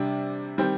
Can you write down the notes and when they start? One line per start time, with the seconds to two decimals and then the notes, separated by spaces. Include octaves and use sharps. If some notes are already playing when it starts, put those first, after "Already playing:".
Already playing: C3 G3 D4
0.58 D#3 G3 C4